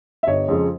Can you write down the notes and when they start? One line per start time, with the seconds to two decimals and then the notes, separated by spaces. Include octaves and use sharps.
0.23 E5
0.27 G1 C#5 D#5
0.48 F2 C#3 F3 G#3